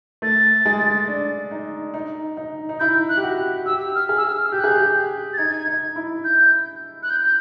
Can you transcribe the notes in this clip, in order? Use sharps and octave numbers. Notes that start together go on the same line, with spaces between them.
A3 A6
G#3
D4
D#4
D#4
D#4
D#4
E4 G6
F#6
G4
F#4
G4 E6
F6
G#4
E6
F6
G4 G6
F#6
G#4 G6
G4
A6
D#4 G#6
D#4
E4
G6
F#6
G6
G6